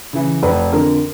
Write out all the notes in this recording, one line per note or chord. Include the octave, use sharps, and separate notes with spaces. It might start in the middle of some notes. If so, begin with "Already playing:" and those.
C#3 E3
F1 B4
F2 D3 A#4